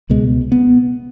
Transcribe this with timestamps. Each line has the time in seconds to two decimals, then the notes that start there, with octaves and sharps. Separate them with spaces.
0.10 C#2 B2 G#3
0.52 B3